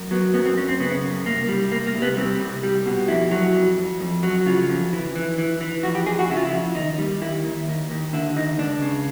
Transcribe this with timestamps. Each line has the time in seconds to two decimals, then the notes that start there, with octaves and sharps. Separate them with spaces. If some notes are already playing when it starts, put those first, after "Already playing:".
Already playing: F#2
0.11 F#3 B3
0.34 F#2 B3
0.45 C4
0.57 F#2 C#4
0.68 C4
0.80 C#3 B3
1.03 F#2
1.26 C2 A#3
1.49 G3
1.71 C2 A#3
1.87 A#3
1.95 C2
2.02 B3
2.17 G3 C4
2.40 C2
2.63 G3
2.86 B2
3.08 F2 E4
3.31 F#3
3.54 F2
3.78 F2
4.00 F2
4.23 F#3
4.46 C#3 F4
4.69 F2
4.92 E3
5.16 E3
5.38 E3
5.61 E3
5.83 F2 F#4
5.95 G4
6.06 F2 G#4
6.19 F#4
6.30 C#3 E4
6.37 F4
6.45 E4
6.53 F2
6.75 D#2 D#4
6.99 G3
7.21 D#2 E4
7.45 D#2
7.68 D#2
7.91 D#2
8.13 D3 E4
8.36 D#2 D#4
8.59 C#2 D4
8.82 C#3